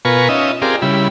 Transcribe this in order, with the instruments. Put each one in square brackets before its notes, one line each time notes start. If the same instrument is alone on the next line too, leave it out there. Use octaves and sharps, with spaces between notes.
[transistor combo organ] B2 F4 A#4 B4 G#5 C#6
C#4 D#4 F4 D#5 E5
C4 F4 G4 G#4 A#4 D5
C#3 G3 E4 B5